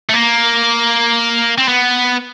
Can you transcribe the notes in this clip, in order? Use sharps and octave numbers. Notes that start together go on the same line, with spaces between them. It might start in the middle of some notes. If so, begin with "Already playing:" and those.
A3
A#3
C4
B3